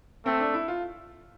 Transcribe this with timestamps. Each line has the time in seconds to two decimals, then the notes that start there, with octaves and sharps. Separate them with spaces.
0.25 A3 C4
0.40 D4
0.54 E4
0.68 F4